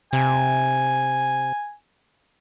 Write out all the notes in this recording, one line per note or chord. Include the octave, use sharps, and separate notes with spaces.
C3 G#5